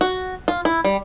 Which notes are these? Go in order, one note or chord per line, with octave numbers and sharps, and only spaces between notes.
F#4
F4
E4
G3